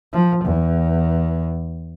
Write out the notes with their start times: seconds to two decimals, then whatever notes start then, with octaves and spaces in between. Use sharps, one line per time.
0.13 F3
0.44 E2